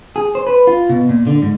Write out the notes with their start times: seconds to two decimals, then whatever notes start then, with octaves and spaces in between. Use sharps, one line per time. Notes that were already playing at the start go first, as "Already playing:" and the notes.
0.16 G#4
0.35 C5
0.47 B4
0.67 F4
0.89 B2
1.09 A#2
1.27 D3
1.42 G#2